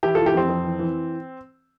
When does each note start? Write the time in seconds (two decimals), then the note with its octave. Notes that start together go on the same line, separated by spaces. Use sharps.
0.03 E3 E4 G4
0.15 E3 F4 A4
0.26 E4 G4
0.34 F2 C4
0.49 F2
0.64 E3
0.79 E3